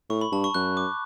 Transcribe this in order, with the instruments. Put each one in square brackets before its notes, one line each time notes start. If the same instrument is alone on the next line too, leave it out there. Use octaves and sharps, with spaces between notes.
[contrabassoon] A2 [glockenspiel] C#6
[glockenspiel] B5
[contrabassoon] G2 [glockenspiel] A5
[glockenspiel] C#6
[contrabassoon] F#2 [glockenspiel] F#6
[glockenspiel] D6